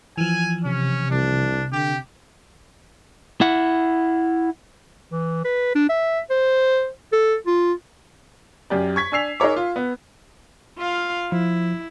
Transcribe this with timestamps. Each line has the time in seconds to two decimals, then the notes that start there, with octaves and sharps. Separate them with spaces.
0.17 E3 F3 G#5
0.65 C3 C#4
1.11 C2 D4
1.72 D3 G4
3.41 E4 F#5
5.11 E3
5.45 B4
5.75 D4
5.89 E5
6.30 C5
7.13 A4
7.47 F4
8.70 F#2 G4 D5
8.96 C#6 G#6 B6
9.12 D4 G#5 E6 C7 F7
9.40 D#4 G#4 A#4 C#5 D6
9.56 F4
9.76 B3
10.78 F4 F5
11.32 F3 E4